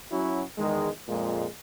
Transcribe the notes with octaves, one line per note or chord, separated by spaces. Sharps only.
F#3 C#4 E4 F#4
E2 D#3 G#3
F2 A#2 G#3